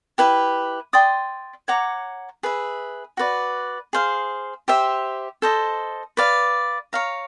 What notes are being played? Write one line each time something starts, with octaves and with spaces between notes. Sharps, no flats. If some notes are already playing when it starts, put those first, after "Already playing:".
E4 G4 B4
D5 G5 C6 D#6
C#5 F#5 A#5 D6
G#4 B4 E5
F#4 B4 D5
G#4 C5 F5
G4 C5 E5
A4 C5 D#5
B4 D5 F5
C#5 F5 A#5